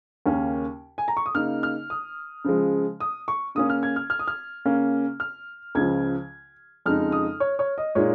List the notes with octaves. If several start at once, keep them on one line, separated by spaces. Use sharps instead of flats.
D#2 C#3 A#3 C#4
G#5
A#5
C#6
D#6
C#3 A#3 D#4 F6
F6
D#6
C#3 F3 G#3
D#6
C#6
C#3 A#3 C#4 D#6
F6
G#6
F6
F6
D#6
F6
C#3 A#3 C#4
F6
C#2 C#3 F3 G#6
F2 C#3 G#3 D#4 F6
D#6
C#5
C#5
D#5
A#2 G#3 D#4 C#5